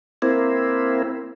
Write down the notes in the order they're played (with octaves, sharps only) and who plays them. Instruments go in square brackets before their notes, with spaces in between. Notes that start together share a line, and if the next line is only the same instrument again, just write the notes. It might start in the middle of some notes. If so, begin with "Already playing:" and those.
[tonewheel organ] A#3 C4 E4